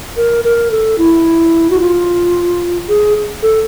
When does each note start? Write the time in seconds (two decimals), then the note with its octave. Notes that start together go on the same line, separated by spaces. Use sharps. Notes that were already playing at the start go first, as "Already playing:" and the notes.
0.17 A#4
0.44 A#4
0.71 A4
0.98 E4
1.70 F#4
1.80 F4
2.89 G#4
3.42 A4